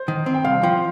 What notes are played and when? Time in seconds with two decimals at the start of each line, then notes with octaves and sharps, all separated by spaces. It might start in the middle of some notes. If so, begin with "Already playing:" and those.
Already playing: C5
0.08 D#3
0.26 C4
0.34 G5
0.44 C2 F5
0.63 F3 G5